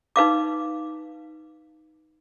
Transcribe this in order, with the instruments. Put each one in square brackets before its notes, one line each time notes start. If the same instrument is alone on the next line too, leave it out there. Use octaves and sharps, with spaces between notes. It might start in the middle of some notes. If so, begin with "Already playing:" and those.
[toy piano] D#4 B4 F5 D6